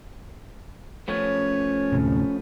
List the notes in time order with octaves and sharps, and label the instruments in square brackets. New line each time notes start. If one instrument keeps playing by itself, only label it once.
[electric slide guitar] F3 A3 B3 [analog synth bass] C#4 [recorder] C#5
[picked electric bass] D2 A2 C3